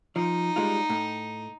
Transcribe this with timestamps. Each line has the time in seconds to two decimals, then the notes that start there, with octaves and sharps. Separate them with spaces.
0.16 F3 D#4
0.56 G3 G#3 F4
0.90 A2